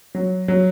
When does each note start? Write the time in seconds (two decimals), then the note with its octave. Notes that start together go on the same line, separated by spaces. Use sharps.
0.15 F#3
0.48 F#3